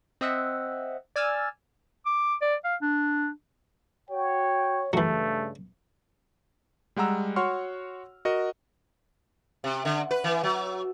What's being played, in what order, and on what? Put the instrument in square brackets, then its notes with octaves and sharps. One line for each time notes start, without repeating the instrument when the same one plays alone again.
[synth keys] C4 D#5 E5 F#5
D5 G#5 E6 F6 A6
[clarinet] D6
D5
F5
D4
[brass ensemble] F#4 G5 [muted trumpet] C#5
[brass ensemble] G2 C#3 [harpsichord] E3 F#3 [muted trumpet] A3
[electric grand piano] G3 G#3 F#5 A#5 E6
F#4 C#5 F#5 C6 C#6 F6
F#4 A#4 D#5 F#5
[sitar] C3
D3
B4
E3
F#3